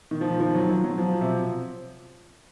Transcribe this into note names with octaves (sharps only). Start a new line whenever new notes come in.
D#3
F3
D#3
F3
F#3
F#3
F#3
F3
C3